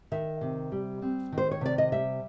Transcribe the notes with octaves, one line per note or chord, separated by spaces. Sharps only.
D#3 E5
C3
G3
C4
D#3
C5
C#5
C3 D5
D#5
G3 E5